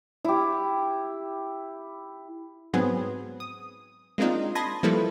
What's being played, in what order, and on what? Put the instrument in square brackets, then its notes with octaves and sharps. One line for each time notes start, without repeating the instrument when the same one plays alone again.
[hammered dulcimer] E4 G4
[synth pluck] G#2 F#3 B3 C4 G#4
D#6
G#3 A#3 C4 D4 D#4 F4
A5 B5 C6 D#6 G#6 A#6
F3 G3 A#3 E4 A4 B4